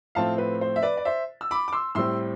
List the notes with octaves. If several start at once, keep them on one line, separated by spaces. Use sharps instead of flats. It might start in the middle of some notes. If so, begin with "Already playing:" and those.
A2 F3 A3 C4 F5 A5
B4
C5
E5
B4 D5
D5
C5 E5
E6
B5 D6
D6
C6 E6
A2 G3 C4 C6 E6